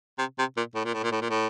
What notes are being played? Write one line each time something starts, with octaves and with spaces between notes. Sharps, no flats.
C3
C3
A#2
A2
A#2
A2
A#2
A2
A#2
A2